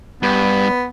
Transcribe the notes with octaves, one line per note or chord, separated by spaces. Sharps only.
G2 B3